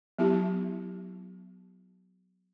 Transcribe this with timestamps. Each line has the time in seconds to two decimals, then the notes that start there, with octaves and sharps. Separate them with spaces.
0.19 F#3 B3 E4 G4